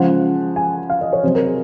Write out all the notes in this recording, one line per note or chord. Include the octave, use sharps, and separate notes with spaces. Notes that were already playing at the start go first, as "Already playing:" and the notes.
Already playing: C#3 F3 G#3 F#5
G#5
F5
D#5
C#5
C3 F#3 C5
A#4
G#4